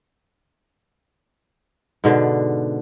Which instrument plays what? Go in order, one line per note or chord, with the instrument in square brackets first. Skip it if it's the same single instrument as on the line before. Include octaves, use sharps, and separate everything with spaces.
[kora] G#2 B2 D3